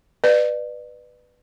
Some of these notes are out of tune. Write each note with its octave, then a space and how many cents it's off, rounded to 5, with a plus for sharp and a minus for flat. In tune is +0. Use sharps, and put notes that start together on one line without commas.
B4 +0 D5 +35